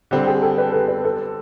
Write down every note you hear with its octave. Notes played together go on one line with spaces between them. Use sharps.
D3 G3 C4 G4
G#4
A4
B4
A4
B4
A4